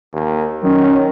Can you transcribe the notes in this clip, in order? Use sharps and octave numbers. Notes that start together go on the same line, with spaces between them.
D#2
D#3 F#3 C#4